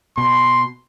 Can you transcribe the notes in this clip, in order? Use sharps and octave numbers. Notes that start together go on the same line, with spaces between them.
B2 C6